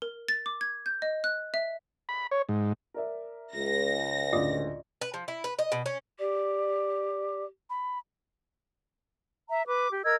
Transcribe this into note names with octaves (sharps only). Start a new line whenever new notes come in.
A#4
A6
D6
G#6
G6
D#5
F#6
E5
B5
C#5
G#2
A#4 D5 E5
C#2 A#6
A1 D2 F4 D5 D#5
B4
F3
E4
B4
D#5
B2
C#4
G4 D5
B5
E5 A#5
B4 D6
G4
A#4 D#5 E6 G#6